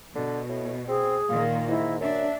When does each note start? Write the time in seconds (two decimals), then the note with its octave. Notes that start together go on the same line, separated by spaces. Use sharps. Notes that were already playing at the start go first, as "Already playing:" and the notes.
0.15 B2 D3
0.49 A2
0.88 C4 G#4
1.29 A#2 D#3 A#3 F4
1.68 G#2 E4
2.00 F#2 D4 E5